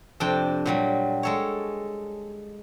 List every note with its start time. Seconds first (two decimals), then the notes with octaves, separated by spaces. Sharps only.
0.20 F2 C3 D4 G5
0.66 A#2 F#3 G3
1.23 G#3 A4 C#5